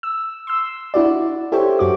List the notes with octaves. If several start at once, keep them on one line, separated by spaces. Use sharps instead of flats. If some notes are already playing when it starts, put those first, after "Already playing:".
E6
C6 E6
D4 E4 F#4 D5
E4 G4 A4 C5 C#5
F#2 F#4 D6